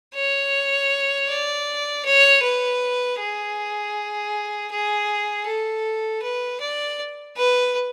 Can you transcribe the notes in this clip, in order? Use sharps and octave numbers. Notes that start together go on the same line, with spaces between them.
C#5
D5
C#5
B4
G#4
G#4
A4
B4
D5
B4